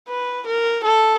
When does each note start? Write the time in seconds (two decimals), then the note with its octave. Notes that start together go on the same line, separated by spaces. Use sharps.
0.08 B4
0.46 A#4
0.84 A4